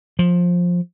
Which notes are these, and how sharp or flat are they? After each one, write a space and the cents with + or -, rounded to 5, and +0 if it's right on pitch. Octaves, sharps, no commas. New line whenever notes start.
F3 +15